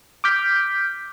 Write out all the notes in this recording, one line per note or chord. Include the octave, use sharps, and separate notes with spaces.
D6 F6 G6 B6